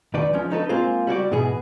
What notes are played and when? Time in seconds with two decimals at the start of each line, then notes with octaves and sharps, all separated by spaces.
0.14 D2 D#3 B4 D5
0.33 F3 G#3 C#4
0.50 C#4 D#4 A4 B4
0.69 G#3 A#3 C4 F4 G#4 C5
1.07 G3 F#4 C#5 D5
1.31 G#2 B2 E3 B3 G#4